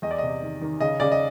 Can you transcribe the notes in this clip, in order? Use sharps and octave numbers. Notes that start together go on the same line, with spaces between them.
E2 D#5
D5
C3 D#5
D#3
D#3
C#3 D#5
C#3 D5
D#5